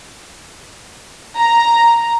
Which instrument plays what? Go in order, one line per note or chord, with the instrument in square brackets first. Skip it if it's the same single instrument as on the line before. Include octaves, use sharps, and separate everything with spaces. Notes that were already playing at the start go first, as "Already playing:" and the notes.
[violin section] A#5